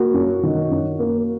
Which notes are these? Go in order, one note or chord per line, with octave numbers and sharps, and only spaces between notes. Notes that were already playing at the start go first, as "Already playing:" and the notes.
Already playing: A#3 F#4
F#2
D#3
F#2
A#3